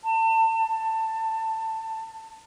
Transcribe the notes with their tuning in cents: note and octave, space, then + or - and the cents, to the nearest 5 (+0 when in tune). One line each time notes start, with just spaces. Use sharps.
A5 +30
A5 +20